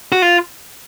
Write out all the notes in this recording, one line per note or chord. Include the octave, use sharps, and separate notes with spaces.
F#4
F4